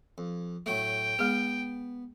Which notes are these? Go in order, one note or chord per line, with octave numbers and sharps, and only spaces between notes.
F2
A2 F#3 A3 G5
G#3 B3 G#4